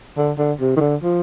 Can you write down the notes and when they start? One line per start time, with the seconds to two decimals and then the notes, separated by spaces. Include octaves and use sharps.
0.17 D3
0.38 D3
0.60 C3
0.76 D#3
0.80 D3
1.03 F3